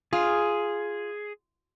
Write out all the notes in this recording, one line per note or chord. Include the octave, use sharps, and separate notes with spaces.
F4 G#4